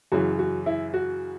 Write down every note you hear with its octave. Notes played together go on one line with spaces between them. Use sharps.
F#2 C#3 E3 F#4
F#4
E4
F#4